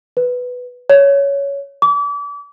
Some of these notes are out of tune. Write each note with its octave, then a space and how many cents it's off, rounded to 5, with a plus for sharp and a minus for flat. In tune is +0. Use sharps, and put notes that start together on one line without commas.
B4 +5
C#5 +10
D6 -35